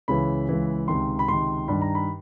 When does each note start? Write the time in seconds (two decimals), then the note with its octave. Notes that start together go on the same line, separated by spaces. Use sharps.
0.08 C#2 C#3 E3 B5
0.49 C#2 C#3 E3
0.88 C#2 C3 D#3 C6
1.19 B5
1.28 C#2 C3 D#3 C6
1.68 G2 D#3 B5
1.81 A#5
1.95 B5